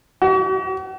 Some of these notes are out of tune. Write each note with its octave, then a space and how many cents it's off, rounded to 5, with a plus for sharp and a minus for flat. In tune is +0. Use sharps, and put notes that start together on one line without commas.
F#4 +45